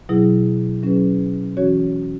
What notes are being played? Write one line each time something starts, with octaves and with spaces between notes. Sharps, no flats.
B2 F#3 E4 G#4
F#3 C#4 G#4 B4
E3 C#4 F#4 C#5